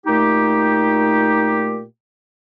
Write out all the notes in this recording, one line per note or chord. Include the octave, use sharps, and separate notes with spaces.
A#2 A3 D#4 G4